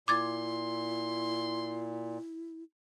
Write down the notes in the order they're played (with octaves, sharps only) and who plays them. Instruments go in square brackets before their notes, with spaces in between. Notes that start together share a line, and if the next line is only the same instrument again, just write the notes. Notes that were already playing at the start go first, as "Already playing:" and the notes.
[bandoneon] A#2 [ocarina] E4 [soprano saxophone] C6 [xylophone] D6 G#6 A6